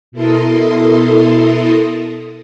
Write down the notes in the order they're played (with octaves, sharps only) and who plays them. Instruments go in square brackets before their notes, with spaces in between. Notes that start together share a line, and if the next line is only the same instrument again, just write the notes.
[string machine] B2 E4 A4 A#4 C6 D#6